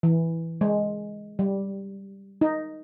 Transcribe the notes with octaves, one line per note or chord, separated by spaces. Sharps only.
E3
G#3
G3
D#4